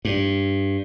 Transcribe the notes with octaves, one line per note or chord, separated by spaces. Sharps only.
G2